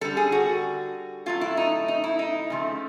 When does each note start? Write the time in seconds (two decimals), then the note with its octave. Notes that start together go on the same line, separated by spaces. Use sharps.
0.01 D3 G3 A4
0.17 G#4
0.32 F#4
1.26 A2 F#3 A3 F4
1.41 E4
1.57 D#4
1.88 D#4
2.04 E4
2.19 D#4
2.50 C#3 F3 A3